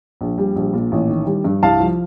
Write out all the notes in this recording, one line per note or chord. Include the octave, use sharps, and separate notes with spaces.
A#1
G3
A#1
A#2
A1
D#3
G3
G2
C2 F5 A5
F3